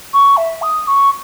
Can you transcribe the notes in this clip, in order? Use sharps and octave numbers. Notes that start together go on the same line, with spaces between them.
C#6
E5
D#6
C#6